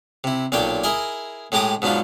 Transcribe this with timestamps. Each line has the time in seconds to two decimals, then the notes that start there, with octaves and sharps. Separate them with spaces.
0.24 C3 E4
0.52 B1 A#2 D4 C#5 G5 D6
0.83 E4 G#4 A#4 D#5 G#5
1.52 A2 G#3 G4 A#5 D6 D#6
1.82 G#2 B2 F#3 D4 F4